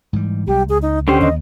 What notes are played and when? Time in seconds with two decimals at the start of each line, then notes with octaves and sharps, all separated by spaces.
0.13 G#2 E3 G3
0.47 B1 D#3 G3 G4
0.69 C#2 G#4
0.82 D#4
1.08 D3 C#4 G4 C5
1.21 D#2 D#5